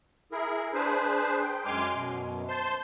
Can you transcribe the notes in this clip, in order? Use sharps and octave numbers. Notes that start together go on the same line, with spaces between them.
E4 G#4 A#4
D4 G#4 B4 C5
G5
F#2 G#3 G#5 C6 D6 F6
F#2 B2
C5 A5 C6